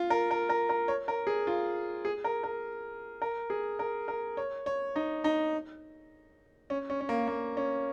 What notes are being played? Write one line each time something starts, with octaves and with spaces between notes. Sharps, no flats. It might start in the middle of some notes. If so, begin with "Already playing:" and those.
Already playing: F4
A#4
A#4
A#4
A#4
C#5
A#4
G#4
F4
G#4
A#4
A#4
A#4
G#4
A#4
A#4
C#5
C#5
D#4
D#4
C#4
C#4
C#4
A#3
A#3
C#4